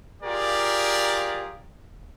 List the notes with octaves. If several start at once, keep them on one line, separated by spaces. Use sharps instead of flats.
F4 G4 G#4 A#4 D5